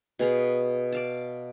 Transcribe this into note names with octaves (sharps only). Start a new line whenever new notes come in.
B2 G#4 F5 B5
D5 F5 A5